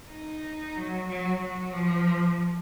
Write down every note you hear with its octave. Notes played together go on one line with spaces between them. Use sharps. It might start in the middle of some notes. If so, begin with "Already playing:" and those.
D#4
F#3
F#3
F#3
F3